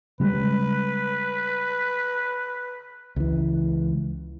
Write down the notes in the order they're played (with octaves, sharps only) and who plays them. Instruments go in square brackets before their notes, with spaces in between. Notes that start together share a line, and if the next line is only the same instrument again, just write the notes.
[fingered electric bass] C#3 G3 G#3 [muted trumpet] B4
[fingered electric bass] C#2 E3